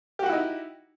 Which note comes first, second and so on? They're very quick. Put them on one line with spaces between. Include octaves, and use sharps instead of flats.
G4 F#4 F#5 E4 D#4